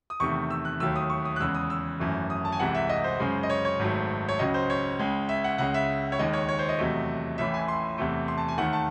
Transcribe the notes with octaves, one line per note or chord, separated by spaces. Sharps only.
D#6
E2 C3 D#3 A3 C#6
E6
F#6
D#2 D#3 F#3 A3 E6
D#6
C#6
D#6
F#6
E2 C#3 G#3 E6
D#6
E6
G#1 F#2 E3 A3
D#6
A5
G#5
C2 C3 E3 G#3 F#5
E5
D#5
C5
F#2 C#3 G#3
D#5
C#5
C#5
G#1 G#2 F#3 A3
C#5
C#2 C#3 F#3 D#5
C5
C#5
C#2 C#3 G#3
E5
F#5
C#2 C#3 G#3 F#5
E5
C#5
D#2 D#3 G#3 D#5
C#5
C#5
C5
D#5
E2 C3 F#3 A3
A1 A2 E3 E5
G#5
C6
E2 C3 E3 A3
C6
A5
G#5
D#2 D#3 A3 F#5
A5